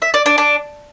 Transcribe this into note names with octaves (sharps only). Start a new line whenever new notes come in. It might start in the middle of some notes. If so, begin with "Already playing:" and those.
E5
D5
D4
D4